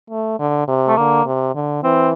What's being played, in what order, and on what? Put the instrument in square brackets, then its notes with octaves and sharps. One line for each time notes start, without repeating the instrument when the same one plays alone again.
[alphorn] A3
D3
C3
[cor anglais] A3
[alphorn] D3 [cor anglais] A#3
[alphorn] C3
D3
[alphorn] E3 [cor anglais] C4